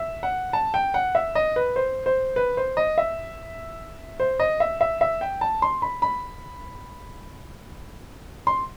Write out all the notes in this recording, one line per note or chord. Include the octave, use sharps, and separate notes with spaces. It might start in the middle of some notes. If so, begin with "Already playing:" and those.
Already playing: E5
F#5
A5
G5
F#5
E5
D#5
B4
C5
C5
B4
C5
D#5
E5
C5
D#5
E5
E5
E5
G5
A5
C6
B5
B5
C6